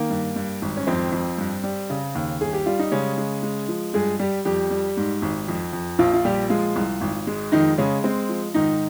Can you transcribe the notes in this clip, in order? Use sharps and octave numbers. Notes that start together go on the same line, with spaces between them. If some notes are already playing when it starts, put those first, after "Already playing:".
Already playing: D#3 A#3
G2
G2
G#1
C#4
F2 C4
F2
G2
G3
C#3
D#2
G1 G#4
G4
G3 F4
D#4
C#3 G#3 C#4
G#3
G#3
F3
G2 G#3 G#4
G3 G4
F2 G3 G4
G3
G#2
G#1
F2
F2
A#1 F3 F4
F4
A#2 G3 G4
F3 G#3 F4
C2
G#1
G#3
F2 D#3 D#4
C#3 G#3 C#4
G#3 C4
F3
G#2 D#3 D#4